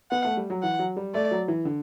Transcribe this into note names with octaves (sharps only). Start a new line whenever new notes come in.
B3 F#5
A3
G3
F#3
E3 F#5
F#3
G3
A3 D5
F#3
E3
D3